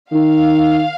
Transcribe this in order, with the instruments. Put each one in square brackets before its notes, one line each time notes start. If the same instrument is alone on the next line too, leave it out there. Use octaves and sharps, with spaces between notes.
[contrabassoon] D#3 [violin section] F5